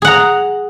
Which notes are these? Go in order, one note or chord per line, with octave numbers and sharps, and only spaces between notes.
G#4 F#5 A#5